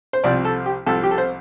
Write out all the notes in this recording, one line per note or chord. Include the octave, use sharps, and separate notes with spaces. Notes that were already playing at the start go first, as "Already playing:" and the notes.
C5
C2 C3 F3 C4 D5
A4
G4
C2 C3 F3 C4 A4
G4
A4
C5